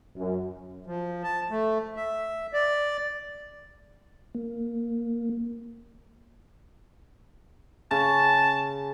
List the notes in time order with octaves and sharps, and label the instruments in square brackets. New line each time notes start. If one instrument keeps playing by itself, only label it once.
[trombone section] F#2
[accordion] F3
A5
A3
E5
D5
[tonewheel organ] A#3
[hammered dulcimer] C#3 [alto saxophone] A5